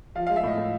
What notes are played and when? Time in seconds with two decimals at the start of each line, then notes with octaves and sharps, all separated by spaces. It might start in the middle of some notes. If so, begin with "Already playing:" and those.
0.15 F3 F5
0.27 G#3 F5
0.36 E5
0.43 A2 D#5
0.57 A2